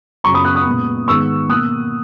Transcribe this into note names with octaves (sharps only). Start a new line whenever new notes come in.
F#2 C#3 F#3 A#5 C#6
B5 D#6
D#6 F#6
D#6 F#6
A#2 G#3 B3
G#2 D#3 G#3 B3 C#6 E6
B2 A#3 D#6 F#6